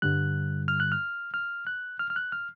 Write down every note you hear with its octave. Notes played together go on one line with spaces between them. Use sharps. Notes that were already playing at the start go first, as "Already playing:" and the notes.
G2 D3 G3 F#6
F6
F#6
F6
F6
F#6
F6
F6
F#6
F6